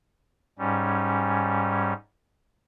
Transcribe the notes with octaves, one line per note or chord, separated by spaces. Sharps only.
G#2 G3 C#4